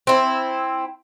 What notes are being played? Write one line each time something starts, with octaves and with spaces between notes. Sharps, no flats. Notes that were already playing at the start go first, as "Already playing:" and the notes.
C4 E4